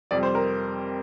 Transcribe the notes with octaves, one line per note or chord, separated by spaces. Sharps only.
F2 C3 G3 D5
C5
A#4